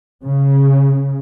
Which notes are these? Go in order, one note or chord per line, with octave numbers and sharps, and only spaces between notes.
C#3